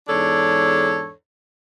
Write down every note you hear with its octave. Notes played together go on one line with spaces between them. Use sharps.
E2 G#2 D4 A4 C#5